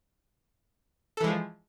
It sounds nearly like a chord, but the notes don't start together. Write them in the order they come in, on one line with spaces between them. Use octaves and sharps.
A4 E3 G#3 F3